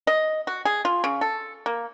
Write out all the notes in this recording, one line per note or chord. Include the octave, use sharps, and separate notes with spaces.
D#5
F#4
G#4
F4
C#3
A4
A#3